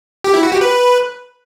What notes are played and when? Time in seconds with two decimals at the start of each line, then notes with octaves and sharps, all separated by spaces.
0.24 G4
0.34 E4
0.43 F#4
0.52 G4
0.61 B4